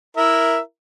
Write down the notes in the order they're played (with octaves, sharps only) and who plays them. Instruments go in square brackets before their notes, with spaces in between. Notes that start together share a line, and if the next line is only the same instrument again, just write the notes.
[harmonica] E4 A#4 E5